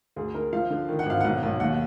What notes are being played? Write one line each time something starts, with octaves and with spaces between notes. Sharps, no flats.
D2 G#4
D3 A#4
F3 F5
D3
D#3
F#5
G#1 F5
B1 F#5
B1
D#2 F#5